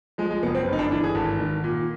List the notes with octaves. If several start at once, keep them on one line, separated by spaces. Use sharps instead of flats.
F3 G#3
G#3
F#1 B3
C4
G1
D#4
D4
E3 D4
G#4
G#1 A4
D#3
A#2